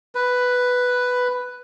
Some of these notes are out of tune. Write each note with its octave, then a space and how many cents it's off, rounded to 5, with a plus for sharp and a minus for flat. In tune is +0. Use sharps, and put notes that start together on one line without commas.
B4 +5